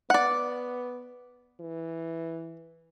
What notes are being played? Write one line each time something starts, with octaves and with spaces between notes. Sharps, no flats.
B3 D5 F#5
E3